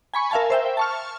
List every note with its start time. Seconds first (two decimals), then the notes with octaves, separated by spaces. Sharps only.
0.14 G#5 B5 C#6
0.31 A#4 E5 F5 G#5 A5
0.50 C5 E5 G5
0.77 A5 C#6 F6